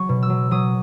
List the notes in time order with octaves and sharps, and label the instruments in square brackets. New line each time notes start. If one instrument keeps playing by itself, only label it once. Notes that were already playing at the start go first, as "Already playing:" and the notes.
Already playing: [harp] F#3 C#6
B2
E6
F#3
F#3 D#6